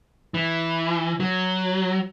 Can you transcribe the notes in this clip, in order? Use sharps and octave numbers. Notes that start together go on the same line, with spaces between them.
E3
F#3